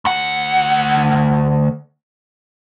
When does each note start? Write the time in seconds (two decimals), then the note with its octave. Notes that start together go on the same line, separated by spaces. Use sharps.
0.05 D2 F#5